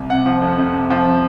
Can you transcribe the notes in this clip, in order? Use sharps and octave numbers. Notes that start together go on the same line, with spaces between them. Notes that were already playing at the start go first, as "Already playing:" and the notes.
Already playing: C2
C3 F#5
F3
F2
F2
C3
F3